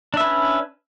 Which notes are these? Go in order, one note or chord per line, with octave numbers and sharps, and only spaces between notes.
C#4 D4 B4 E5